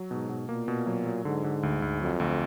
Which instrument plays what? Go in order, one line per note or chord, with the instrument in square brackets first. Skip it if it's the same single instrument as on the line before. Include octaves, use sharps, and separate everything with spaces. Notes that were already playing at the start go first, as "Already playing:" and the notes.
Already playing: [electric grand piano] F#3
[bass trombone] G#2 [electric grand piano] B2
[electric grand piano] B2
[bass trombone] A#2 [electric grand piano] A#3
[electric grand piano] B2
F#3
F#3
[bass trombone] G#2 [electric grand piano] D3
[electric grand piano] D3
D2
D2
[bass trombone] F2 [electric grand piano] F#3
[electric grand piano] D2